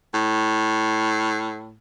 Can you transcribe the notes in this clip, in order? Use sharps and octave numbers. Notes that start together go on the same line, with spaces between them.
A2